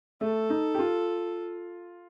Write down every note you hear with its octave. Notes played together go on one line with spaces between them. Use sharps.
A3 A4
D#4
G4
F4